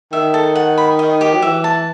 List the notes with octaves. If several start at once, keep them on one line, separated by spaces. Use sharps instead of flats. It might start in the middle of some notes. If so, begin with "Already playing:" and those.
D#3 E5
A4
F#5
B5
D#5
G4
F#3
E3 E5
A5